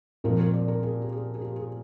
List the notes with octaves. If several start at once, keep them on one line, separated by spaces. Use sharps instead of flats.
A#2 F3 G#3 C4 A#4
A#4
D5
A#4
G#4
G4
G#4
G#4
G4
G#4